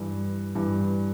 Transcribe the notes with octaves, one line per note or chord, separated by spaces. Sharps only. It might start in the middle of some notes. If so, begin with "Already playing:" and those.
Already playing: G2 E3
G2 E3